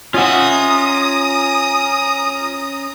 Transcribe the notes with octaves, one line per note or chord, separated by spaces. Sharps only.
C#4 F4 D#5 E5 F#5 A#5 D#6